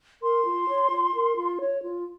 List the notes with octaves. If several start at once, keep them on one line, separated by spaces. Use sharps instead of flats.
A#4 C6
F4
C#5
F4
A#4
F4
C#5
F4